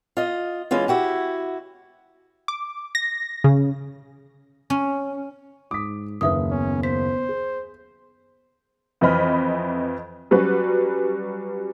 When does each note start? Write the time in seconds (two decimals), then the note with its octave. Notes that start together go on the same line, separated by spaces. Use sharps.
0.17 F4 D#5
0.71 E3 G#3 C#4 F4
0.88 E4 F#4 G4
2.48 D6
2.95 A#6
3.44 C#3
4.70 C#4
5.71 G#2 D6 D#6 B6
6.21 F#1 D#2 B4 E5 D#6
6.51 B3 C#4
6.83 C5 B6
7.29 G#4
9.01 F2 E3 D#5 B5 F6
10.31 F#3 G3 C#4 F#4 B4